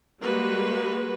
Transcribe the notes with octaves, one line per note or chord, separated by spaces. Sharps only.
G3 G#3 A#3 F#4 B4